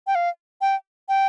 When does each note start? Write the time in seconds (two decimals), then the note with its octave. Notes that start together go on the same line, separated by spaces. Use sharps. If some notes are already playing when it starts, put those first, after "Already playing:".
0.07 G5
0.15 F5
0.61 G5
1.09 G5